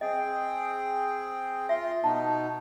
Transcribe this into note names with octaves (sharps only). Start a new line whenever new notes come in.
C4 G#4 D#5 G5
F4 E5 C6
B2 B3 D#4 A5